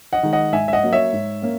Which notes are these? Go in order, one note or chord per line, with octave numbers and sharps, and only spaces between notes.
D#5 F#5
D#3 G#3
D#5 F#5
G#2 E5 G#5
E5
D#5 F#5
F#3 A#3 C#4
C#5 E5
G#2
A#3 C#4